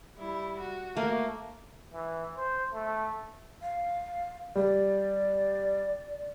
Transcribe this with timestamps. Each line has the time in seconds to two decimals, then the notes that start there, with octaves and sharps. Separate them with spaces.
0.16 G3 E4
0.60 F#4
0.97 A3 A#3
1.93 E3
2.37 C5
2.73 A3
3.62 F5
4.56 G3 D5